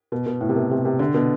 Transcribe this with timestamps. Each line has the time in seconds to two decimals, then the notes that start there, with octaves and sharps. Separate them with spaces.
0.12 B2
0.26 B2
0.41 A2
0.49 C3
0.56 B2
0.71 C3
0.85 C3
0.99 D3
1.14 B2